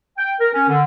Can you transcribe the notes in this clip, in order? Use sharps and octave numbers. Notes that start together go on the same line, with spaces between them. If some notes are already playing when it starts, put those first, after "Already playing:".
G5
A#4
C#4
D3